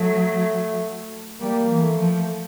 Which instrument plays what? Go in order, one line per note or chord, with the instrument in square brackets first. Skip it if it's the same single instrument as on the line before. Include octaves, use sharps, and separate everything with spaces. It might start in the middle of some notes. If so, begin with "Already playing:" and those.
Already playing: [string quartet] F#3 [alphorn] A3
[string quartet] G3 [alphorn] A#3
[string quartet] E3
[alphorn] A3
[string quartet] F3